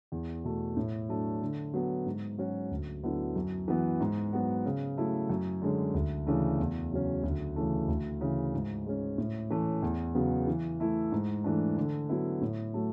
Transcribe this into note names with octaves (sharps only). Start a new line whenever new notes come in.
E2
B2 A3
A2
F#3 A3 D4
D3
F#3 B3
G#2
F#3 C#4 F#4
D2
D3 F#3 B3 E4
F#2
E3 B3 F#4
G#2
F#3 B3 F#4
C#3
F#3 A3 E4
F#2
D3 G#3 C#4
D2
C#3 E3 A3 D4
E2
C#3 F#3 C#4
D2
C#3 E3 A3
D2
C#3 E3
G#2
G#3 C#4
A2
E3 A3 C#4
E2
C#3 F#3 B3
E3
A3 E4
G#2
E3 A3 D4
D3
F#3 B3 E4
A2
F#3 A3